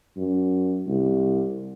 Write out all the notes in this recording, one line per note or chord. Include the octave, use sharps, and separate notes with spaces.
F#2
C2